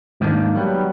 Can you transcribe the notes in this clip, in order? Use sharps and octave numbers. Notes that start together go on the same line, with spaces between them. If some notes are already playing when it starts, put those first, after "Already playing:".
G#2 D#3 F3 A#3 D4
F#3 G3 B3